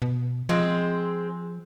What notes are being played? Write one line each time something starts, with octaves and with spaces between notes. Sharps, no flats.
B2
F3 G#3 C4